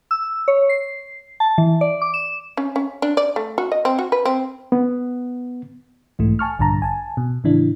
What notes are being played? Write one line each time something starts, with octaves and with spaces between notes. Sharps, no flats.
E6
C#5
C7
A5
E3
D5
D6
E7
C#4
C#4
D4
D5
A3
F#4
D#5
C4
F#4
B4
C4
B3
B1 G#2 E3 A3
G#5 A5 C#6 F6
A#1 G2 D3 A5 A#5
G#5 A5
B2
A2 C#3 E3 D4 E4